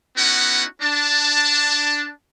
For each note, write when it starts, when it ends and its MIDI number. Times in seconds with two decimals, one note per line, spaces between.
0.17 0.65 59
0.17 0.65 61
0.17 0.65 63
0.17 0.65 64
0.17 0.65 66
0.17 0.65 78
0.82 2.11 62
0.82 2.11 81